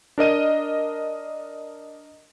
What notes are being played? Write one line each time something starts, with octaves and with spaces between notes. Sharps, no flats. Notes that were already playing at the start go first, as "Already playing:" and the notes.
D4 A#4 D#5 D#7